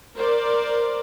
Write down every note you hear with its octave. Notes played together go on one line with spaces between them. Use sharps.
A#4 C5 D5